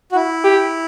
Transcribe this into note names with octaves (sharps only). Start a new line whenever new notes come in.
F#4
E4
G4